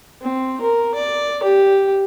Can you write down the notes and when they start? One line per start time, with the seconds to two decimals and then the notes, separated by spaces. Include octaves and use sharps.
0.22 C4
0.61 A#4
0.95 D5
1.43 G4